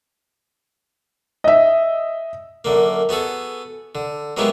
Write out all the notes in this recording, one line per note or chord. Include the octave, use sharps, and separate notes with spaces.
D#5 E5
F#2 D3 A#3
B3 F#4 G#4 A4
D3
F#3 G#3 A#3 B3 E4 G4